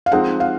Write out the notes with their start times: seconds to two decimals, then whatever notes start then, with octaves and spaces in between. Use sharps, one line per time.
0.06 F5
0.12 F3 G#3 C4 D#4 G#4 F#5
0.40 F5